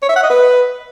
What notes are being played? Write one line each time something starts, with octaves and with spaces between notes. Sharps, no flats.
C#5
E5
F#5
D#5
B4